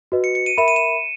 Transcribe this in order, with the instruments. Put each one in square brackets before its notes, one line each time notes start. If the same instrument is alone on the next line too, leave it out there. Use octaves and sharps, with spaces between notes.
[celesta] F#4 B4 D#5
[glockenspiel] C#7
C#7
D#7
[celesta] A#4 E5 B5 [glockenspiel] E7
[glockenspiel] D#7
E7